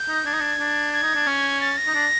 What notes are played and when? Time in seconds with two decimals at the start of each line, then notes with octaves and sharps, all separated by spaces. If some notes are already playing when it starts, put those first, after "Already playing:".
Already playing: G6
0.08 D#4
0.26 D4 G#6
0.33 D#4
0.40 D4
0.60 D4
0.93 G#6
1.03 D#4
1.15 D4
1.27 C#4
1.61 A6
1.78 A#6
1.87 D#4
1.95 D4